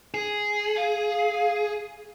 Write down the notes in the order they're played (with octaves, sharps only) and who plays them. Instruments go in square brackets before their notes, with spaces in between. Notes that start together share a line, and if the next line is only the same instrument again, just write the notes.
[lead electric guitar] G#4
[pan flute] F5